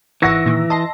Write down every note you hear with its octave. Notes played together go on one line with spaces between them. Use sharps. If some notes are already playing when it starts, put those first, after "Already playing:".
G#1 E3 F#5 C#6 E6 A#6 C#7
A#2 D#3
D#5 A5 C6 A#6